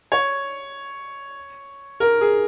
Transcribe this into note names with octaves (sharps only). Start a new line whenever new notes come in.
C#5
A#4
G#4